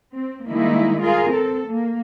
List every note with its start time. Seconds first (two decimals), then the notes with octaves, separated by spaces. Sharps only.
0.14 C4
0.47 D#3 G3 G#3 A#3 D#4 E4
1.00 F4 G#4 A#4
1.30 C4 A4
1.67 A#3